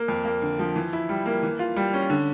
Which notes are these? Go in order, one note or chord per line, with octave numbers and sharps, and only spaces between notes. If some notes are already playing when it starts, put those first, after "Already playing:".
Already playing: A#3
F2
A#3
D3
F3
E3
E4
G3
A#3
E3
F4
G3
C#4
D3